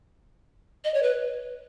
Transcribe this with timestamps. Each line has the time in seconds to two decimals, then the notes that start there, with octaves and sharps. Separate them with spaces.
0.84 D#5
0.94 C#5
1.03 B4